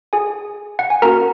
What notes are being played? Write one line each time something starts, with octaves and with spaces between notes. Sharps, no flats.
G#4 G#5
F#5
G#5
A#3 C#4 F#4 A#4 A#5